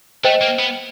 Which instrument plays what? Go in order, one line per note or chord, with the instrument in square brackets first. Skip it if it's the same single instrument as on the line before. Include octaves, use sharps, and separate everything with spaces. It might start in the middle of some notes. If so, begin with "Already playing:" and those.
[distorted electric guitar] A3 [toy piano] C5 D#5 G5
[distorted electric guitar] A#3
B3